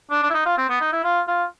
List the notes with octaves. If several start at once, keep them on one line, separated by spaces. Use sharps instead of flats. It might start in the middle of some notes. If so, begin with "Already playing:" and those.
D4
D4
E4
D#4
F4
C4
B3
D#4
E4
F4
F4